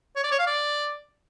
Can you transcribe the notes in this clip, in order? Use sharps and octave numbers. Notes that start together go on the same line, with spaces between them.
C#5
D5
C#5
F5
D5